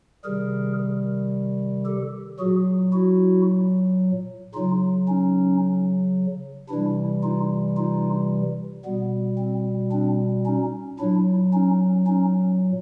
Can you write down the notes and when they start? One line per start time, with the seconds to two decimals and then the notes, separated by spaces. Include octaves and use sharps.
0.24 C3 D#3 G3 G#4 A#4
1.86 G4 A4
2.39 A#2 F#3 F#4 G#4
2.93 E4 F#4
4.54 C#3 F#3 D#4 F4
5.08 C#4 D#4
6.69 C3 E3 G3 D4 E4
7.23 D#4 F4
7.77 D#4 F4
8.85 B2 G3 B3
9.38 C4
9.92 C4 D4
10.46 C#4 D#4
10.99 A#2 F#3 D4 E4
11.53 C#4 D#4
12.07 C#4 D#4